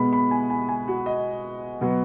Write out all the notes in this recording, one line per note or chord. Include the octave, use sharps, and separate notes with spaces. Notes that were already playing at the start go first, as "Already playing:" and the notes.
Already playing: B2 G#3 B3 B5
B5
G#5
G#5
G#5
F#4
D#5
B2 F#3 B3